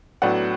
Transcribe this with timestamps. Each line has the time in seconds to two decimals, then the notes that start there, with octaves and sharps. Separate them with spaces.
0.22 A2 F#3 B3 D4 F#5